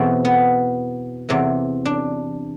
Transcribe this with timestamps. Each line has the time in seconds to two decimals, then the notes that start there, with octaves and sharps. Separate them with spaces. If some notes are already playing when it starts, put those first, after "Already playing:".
Already playing: E2 B2 C4
0.25 B3
1.29 E2 C3 E3
1.85 D4